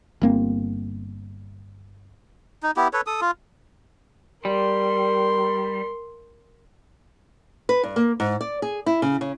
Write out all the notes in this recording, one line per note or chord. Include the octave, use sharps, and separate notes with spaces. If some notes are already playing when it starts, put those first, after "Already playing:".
G1 A#3 C4
D#4
B3 E4 G4
A4 B4 C#5
A4 D#6
F4
G3 A#4 C6
B4
G2
A#3
G#2
D5
G#4
E4
C#3
C#3